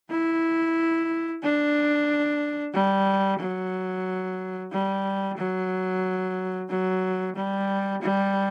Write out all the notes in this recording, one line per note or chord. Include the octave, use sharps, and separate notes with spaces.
E4
D4
G3
F#3
G3
F#3
F#3
G3
G3